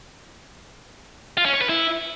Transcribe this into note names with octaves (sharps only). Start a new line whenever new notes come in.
F4
C#4
C#5
B4
E4